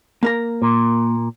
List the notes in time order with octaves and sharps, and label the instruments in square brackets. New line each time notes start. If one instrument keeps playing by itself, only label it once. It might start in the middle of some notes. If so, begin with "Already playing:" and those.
[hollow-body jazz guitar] A#3 A#4 A#5
[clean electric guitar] A#2